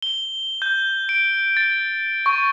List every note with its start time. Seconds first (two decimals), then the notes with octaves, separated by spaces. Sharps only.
0.02 G7
0.62 G6
1.09 D7
1.57 A6
2.26 C#6